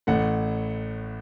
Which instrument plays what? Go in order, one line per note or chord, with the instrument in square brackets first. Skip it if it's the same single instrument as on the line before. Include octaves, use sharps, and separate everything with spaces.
[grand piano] A1 A2 A3 F#5